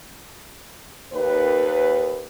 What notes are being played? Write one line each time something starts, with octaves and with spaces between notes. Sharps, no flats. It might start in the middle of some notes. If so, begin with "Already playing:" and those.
D#2 B4